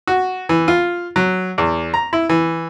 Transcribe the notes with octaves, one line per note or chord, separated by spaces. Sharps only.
F#4
E3
F4
F#3
E2
A#5
E4
E3